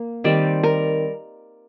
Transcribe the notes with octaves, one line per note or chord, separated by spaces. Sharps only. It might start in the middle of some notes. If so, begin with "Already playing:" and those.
Already playing: A#3
D#3 G3 C4 D5
A#4